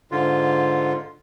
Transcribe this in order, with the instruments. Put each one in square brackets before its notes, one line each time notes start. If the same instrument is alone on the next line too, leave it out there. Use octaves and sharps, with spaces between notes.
[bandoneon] G#2 D3 F4